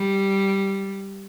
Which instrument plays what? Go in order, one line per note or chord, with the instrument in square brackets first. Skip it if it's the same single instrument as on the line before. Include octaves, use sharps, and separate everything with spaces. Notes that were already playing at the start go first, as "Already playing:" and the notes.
Already playing: [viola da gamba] G3